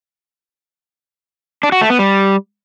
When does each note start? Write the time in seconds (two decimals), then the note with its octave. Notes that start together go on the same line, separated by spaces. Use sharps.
1.63 D4
1.72 F#4
1.81 A3
1.90 B3
1.99 G3